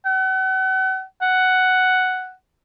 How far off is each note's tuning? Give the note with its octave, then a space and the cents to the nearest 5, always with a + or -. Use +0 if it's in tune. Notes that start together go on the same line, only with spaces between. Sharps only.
F#5 +35
F#5 +5